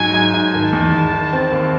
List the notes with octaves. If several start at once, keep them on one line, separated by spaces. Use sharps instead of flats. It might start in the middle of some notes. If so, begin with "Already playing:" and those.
Already playing: G#2 F#3 G#5
G#2
G#2
D#3 A5
E2
E2
D#3
C4
D#2